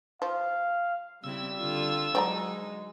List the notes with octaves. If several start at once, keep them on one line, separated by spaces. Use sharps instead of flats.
F3 F5
C#3 G3 C4 E4 E6
D3 F4
F#3 G#3 C4 D#4 D5 A#5